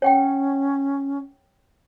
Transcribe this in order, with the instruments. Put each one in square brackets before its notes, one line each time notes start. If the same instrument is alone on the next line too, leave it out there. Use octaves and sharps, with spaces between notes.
[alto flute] C#4 [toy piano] C#5 F#5 G5